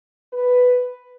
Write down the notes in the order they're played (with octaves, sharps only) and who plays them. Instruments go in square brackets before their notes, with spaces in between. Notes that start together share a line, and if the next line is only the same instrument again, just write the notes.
[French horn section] B4